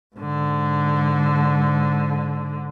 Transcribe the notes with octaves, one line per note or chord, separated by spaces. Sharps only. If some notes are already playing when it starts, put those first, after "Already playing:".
G#2 D3